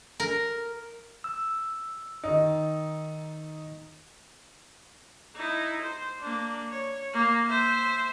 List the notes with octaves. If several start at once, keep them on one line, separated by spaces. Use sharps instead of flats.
A#4
E6
D#3 D#4
D#4 E4
C5
A#3 D4
C#5
A#3
C5 E5